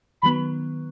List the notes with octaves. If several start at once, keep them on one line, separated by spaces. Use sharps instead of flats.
D#3 F#3 B3 B5